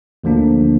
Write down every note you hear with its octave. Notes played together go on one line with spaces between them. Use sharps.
D2 D3 F3 A#3 D4